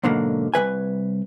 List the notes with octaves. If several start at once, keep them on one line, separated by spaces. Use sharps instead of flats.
G#2 B2 D3 F#3 A#3
C2 C#3 B4 G#5